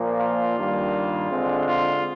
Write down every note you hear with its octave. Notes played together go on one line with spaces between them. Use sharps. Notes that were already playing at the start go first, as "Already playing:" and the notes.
Already playing: A#2 F3 A#3
F4
G2 D#3 G3 A#3
D3 G#3 C4
F4